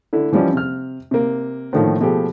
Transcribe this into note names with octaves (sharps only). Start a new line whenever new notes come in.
D3 E4
E3 F3 G3 C#4
C3 F6
C3 A#3
A2 D3 D#3 F3
B2 F3 A3 G4 G#4